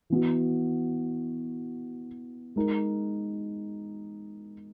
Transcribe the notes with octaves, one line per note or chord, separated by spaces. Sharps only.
E3 B3 F#4
G#3 D#4 A#4